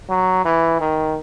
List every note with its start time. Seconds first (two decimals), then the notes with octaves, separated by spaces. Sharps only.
0.10 F#3
0.45 E3
0.80 D#3